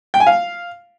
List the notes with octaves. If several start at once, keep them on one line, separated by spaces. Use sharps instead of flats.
G5
G#5
F5